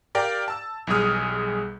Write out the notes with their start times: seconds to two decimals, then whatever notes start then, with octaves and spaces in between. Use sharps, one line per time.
0.15 G4 A#4 D5 F5 G5
0.48 A5 E6
0.87 B1 E2 G3 G#4 D#6 F6